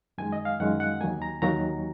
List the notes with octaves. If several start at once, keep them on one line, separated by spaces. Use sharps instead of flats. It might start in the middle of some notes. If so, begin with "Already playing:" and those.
F#2 D#3 G#3 G#5
D#5
F5
F#2 D#3 G#3 F#5
F#5
D#2 D#3 F#3 A#3 G#5
A#5
D#2 D#3 F#3 A#3 A#5